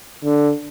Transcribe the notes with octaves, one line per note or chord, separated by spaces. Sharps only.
D3